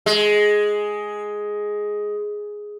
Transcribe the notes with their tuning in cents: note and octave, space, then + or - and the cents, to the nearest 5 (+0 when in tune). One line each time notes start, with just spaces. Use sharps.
G#3 +5